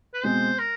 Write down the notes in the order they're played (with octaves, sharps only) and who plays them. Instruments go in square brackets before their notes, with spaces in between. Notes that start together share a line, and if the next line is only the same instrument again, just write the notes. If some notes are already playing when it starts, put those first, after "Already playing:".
[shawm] B4
[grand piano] B2 G#3 C4 [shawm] C5
[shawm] A#4